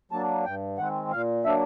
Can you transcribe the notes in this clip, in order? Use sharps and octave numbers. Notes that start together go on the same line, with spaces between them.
F#3 A#3 D4 A5
G2 G5
D#3 G#3 C4 F#5
A#2 F5
F#3 A#3 D4 E5